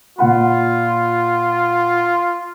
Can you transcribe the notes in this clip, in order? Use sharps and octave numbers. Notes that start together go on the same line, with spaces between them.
A#2 F4 F#5 B5